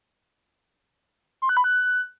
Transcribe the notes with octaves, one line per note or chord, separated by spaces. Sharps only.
C6
F#6
B5
F#6